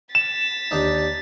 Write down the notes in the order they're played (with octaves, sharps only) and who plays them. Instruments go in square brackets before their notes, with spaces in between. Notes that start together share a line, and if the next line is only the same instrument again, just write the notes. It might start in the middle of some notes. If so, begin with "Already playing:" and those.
[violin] A6 B6 [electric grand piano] E7
[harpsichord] D#2 D4 D#4